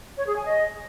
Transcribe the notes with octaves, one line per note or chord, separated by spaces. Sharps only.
C#5
G#4
G#5
D#5